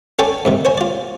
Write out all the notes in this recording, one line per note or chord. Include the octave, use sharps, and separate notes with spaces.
C#4 A4 C#5 D5 G5 G#5
G#2 C3 D#3
C5 C#5 G#5
F4 D5